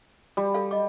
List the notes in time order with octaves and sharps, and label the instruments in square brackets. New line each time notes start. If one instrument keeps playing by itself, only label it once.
[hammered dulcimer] G3
[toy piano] A4 F5
D#5 D6